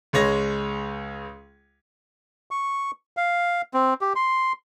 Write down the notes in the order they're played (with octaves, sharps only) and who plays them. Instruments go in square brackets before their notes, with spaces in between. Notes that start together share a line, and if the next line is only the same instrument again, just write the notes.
[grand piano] C#2 G#3 C#5 A#6
[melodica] C#6
F5
C4
G4
C6